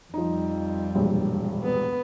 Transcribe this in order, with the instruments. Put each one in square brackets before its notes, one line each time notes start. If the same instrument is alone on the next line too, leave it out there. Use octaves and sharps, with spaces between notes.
[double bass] F2 G3 [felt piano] F3 D#4
[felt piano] E1 A#1 G2
[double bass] B3